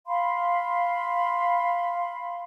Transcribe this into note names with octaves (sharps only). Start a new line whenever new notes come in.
F5 B5 C6